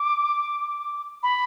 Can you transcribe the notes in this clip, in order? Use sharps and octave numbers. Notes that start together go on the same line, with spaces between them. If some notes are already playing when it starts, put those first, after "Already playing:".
Already playing: D6
B5